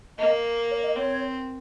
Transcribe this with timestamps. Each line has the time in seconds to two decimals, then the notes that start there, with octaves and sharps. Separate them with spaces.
0.19 A#3 D#5
0.71 C#5
0.83 D#5
0.96 C4 C#5